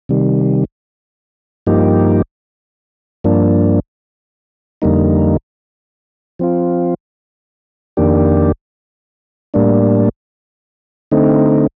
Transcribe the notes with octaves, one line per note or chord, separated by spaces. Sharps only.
C3 D#3 G3
G2 F3 A#3 D#4 G4
G2 F3 A#3 D4
F2 D3 G3 A#3 D#4
F3 C4 F4
F2 D#3 A#3 D4 G4
A2 G3 A#3 D4
D3 A3 C4 D#4